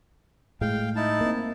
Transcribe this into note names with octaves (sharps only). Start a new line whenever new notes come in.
A2 G#3 F5 G5
D#4 E4 A5
A#3 C4